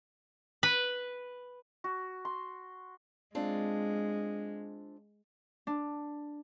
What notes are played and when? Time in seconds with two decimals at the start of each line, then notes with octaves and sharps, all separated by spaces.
0.63 B4
1.84 F#4
2.25 C6
3.35 G#3 C4 D4 F4
5.67 D4